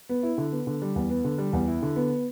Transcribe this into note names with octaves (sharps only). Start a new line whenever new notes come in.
B3
E4
D3
B3
D3
G3
E2
B3
D3
G3
E2
E4
D3
B3